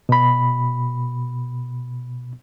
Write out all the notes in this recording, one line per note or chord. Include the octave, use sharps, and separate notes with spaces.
B2 B5